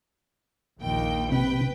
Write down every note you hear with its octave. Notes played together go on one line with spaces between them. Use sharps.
A#1 D#2 G5
C3 B4 G5